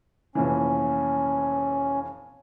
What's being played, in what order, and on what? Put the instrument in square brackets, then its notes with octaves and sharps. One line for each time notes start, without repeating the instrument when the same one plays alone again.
[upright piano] F1 A#2 E3 [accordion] C#4